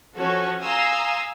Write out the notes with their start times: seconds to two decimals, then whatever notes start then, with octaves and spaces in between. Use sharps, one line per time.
0.16 F3 C#4 F#4 A4 C#5
0.62 F5 G#5 A#5 C6 D#6 E6